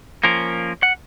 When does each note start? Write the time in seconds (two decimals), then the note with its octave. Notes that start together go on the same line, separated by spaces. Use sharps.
0.24 F3 A#3 C#4 A#4
0.83 F#5